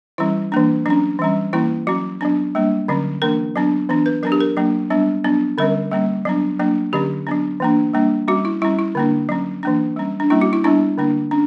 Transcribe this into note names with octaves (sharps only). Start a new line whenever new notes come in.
E3 G3 C#4 E4
E3 A#3 D4
F#3 C#4 D4
E3 G3 C#4
E3 A#3 C#4 E4
F#3 C#4 F#4
F#3 B3 D4
G3 A#3 D4
D3 F#3 C#4
E3 A#3 D4 A#4
F#3 B3 D4
E3 B3 D4
B4
F#3 B3 D4 A#4
G4
A#4
F#3 A#3 D4
G3 B3 D4
F#3 B3 D4
D3 G3 C#4 A#4
G3 A#3 C#4
F#3 B3 D4
F#3 A#3 D4
D3 F#3 C#4 G4
F#3 B3 D4
E3 A#3 D4
G3 A#3 D4
G3 C#4 F#4
E4
G3 C#4 E4
E4
D3 A#3 D4
F#3 C#4
E3 A#3 D4
G3 C#4
D4
G3 A#3 C#4 E4
F#4
E4
G3 B3 D4 E4
D3 A#3 D4
C#4 D4